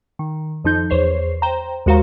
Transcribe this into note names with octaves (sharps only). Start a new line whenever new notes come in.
D#3
F2 F3 D#4 G6
E2 C5 C#5 C7
C5 G5 A#5
D#2 G#3 F#4 C5 F5 A#5